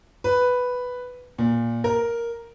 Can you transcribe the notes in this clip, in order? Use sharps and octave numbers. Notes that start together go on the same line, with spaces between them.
B4
A#2
A#4